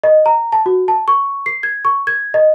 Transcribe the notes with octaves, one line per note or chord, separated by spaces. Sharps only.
D#5
A#5
A5
F#4
A5
C#6
C7
G#6
C#6
G#6
D#5